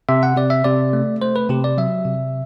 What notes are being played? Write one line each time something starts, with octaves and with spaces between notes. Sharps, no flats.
C3 E5
F#5
C3 D5
E5
C3 D5
A3
A3 C5
B4
C3 G4
D5
F#3 E5
C3